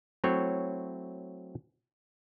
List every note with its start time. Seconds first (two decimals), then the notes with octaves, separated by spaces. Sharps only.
0.24 F#3 A3 C4 E4 C#5